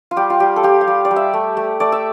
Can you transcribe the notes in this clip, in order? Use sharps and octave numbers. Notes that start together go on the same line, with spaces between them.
F4
G3 G4
F4
G3 G4
A4
F4 G4
F5
G3
D5
G3
E5
A3
A3
A3 D5
E5